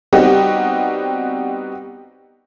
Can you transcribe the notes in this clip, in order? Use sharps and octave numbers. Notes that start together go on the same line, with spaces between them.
G3 B3 C4 D#4 F#4 G4